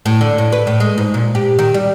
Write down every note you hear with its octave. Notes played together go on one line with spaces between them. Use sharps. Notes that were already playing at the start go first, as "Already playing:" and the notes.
A2
D3
A2
B4
A2
G#3
G#2
A#2
G4
D#3
G3